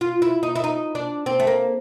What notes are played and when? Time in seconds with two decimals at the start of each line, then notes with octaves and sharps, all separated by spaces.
0.01 F4
0.22 E4
0.43 D#4
0.56 E4
0.64 D#4
0.95 D4
1.26 C4
1.40 A3
1.47 A#3